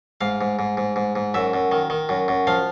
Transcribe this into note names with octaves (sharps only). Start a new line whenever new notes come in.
G#2 F5
G#2
G#2
G#2
G#2
G#2
F#2 E5
F#2
D#3
D#3
F#2
F#2
F3 F5